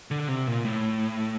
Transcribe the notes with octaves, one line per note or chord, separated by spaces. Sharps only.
D3
C3
A#2
A2